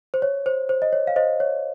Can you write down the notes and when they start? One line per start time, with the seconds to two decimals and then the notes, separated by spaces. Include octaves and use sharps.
0.14 C5
0.22 C#5
0.46 C5
0.69 C5
0.82 D#5
0.93 C#5
1.07 F5
1.16 C5 D#5
1.40 C#5